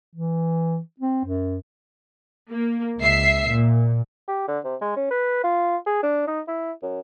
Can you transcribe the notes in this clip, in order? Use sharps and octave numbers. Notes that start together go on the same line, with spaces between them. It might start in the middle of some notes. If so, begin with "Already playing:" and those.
E3
C4
F#2
A#3
C#2 E5 C7
A#2
G4
D3
C3
G#3
C#4
B4
F4
G#4
D4
D#4
E4
F#2